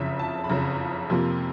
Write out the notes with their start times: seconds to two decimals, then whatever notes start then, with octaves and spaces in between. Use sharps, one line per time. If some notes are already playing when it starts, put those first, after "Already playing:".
Already playing: F#1 F2 C#3 E5
0.19 A5
0.44 B5
0.49 F#1 F2 C#3 A#5
1.10 F2 C3 F3 A#3